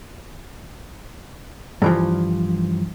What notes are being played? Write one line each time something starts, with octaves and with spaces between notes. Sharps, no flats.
G2 E3 F3